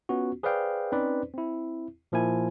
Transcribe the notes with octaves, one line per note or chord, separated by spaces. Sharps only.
B3 C#4 F4 F#4
G#4 B4 C5 D5 F5 G5
C4 C#4 D#4 B4 C5 D5
C4 E4
A#2 F3 A#3 E4 G#5